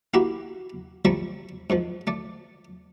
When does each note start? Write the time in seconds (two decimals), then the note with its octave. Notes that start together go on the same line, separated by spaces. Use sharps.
0.14 A#3 E4 F#4 G4 E5 A#5
1.05 F3 G3 A3 E5 A#5 C#6
1.70 G#2 D#3 F3
2.07 A3 D5